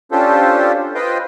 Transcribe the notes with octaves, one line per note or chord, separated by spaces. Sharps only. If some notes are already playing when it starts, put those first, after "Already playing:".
C#4 D4 F4 G4 A4 C5
F4 B4 C5 D#5 F5 G5